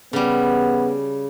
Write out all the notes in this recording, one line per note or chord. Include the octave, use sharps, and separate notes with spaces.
C#3 G3 B3